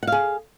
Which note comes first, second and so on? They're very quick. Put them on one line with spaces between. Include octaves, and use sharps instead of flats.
F#5 F5 G#4